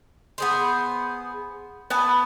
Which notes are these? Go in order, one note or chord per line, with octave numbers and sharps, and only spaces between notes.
B3 G#4 C5
B3 B4 G#5 A5